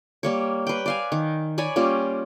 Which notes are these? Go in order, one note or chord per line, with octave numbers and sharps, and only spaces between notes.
G3 A#3 C#5
B4 G5
D5 F5 G#5
D#3
C#5 D5 G#5 B5
G3 A#3 C#4 F4